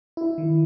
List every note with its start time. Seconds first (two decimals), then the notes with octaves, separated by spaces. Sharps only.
0.17 E4
0.38 D#3